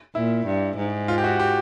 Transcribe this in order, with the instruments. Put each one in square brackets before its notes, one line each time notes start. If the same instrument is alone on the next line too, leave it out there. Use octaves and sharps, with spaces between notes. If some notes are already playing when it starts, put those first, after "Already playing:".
[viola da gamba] A#2 [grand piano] E4
[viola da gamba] G2
G#2
[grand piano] F4
G4
F#4
G4